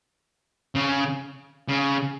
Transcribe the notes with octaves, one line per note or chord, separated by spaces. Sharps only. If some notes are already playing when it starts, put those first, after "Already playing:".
C#3
C#3